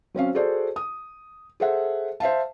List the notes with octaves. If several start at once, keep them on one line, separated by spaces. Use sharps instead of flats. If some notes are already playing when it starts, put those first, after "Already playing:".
F#3 C4 C#4 F5
F#4 G#4 A4 C5 D5
D#6
G#4 A4 C5 E5 F#5
C5 E5 F5 A5